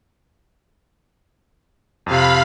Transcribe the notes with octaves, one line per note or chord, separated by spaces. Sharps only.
F2 C3 F5 B5